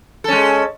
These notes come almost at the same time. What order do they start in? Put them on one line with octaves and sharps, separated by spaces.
A4 C#4 G#3